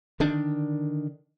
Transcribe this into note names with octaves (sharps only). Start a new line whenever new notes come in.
D3 D#3 D4